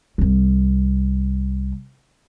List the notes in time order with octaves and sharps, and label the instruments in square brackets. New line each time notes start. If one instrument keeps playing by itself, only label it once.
[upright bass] C2 C4